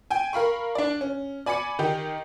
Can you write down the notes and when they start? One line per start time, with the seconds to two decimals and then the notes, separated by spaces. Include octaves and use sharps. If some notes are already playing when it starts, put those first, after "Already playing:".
0.10 G5 G#5
0.33 A#4 F5 B5 C#6
0.75 D4 D5
1.01 C#4
1.46 D5 G#5 B5 D6 C#7
1.79 D#3 D#4 G4